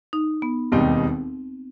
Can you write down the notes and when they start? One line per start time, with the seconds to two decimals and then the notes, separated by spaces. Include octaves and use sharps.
0.13 D#4
0.42 B3
0.72 E1 D#2 D#3 G3 C4 D#4